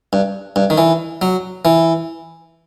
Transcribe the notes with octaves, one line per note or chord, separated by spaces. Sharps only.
G2
G2
D#3
E3
F#3
E3